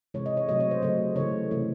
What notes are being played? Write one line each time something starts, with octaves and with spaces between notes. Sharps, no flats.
C3 E3 G#3 C#5
D#5
C#5
C3 F#3 A3 D#5
C#5
C5
C#3 F#3 A3 D#5
C#3 E3 A3 C#5
C3 E3 A3